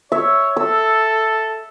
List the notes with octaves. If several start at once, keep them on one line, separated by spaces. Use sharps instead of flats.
C#5 E5
A4 E6